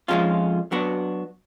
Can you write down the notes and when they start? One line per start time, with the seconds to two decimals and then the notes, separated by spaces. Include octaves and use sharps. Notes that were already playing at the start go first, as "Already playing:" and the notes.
0.08 F2 F3 G#3 C#4 F4
0.72 F#3 B3 D4 F#4